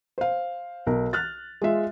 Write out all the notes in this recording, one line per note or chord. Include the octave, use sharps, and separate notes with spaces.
C5 F5
B1 A#4
F6 F#6 A6
G#3 F4 E5